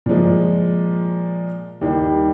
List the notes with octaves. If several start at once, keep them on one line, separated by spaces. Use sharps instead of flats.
A#2 F3 G#3
D#2 D#3 G3